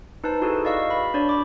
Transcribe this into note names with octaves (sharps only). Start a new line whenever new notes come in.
D#4 B4 C5 A5
E4 F#4 G#4 A4 B4
D5 D#5 F5 C#6 E6
B5
D4 C#5 D5
B5 D6